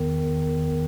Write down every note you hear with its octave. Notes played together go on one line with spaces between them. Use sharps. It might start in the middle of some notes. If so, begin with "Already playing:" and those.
Already playing: E2 D#3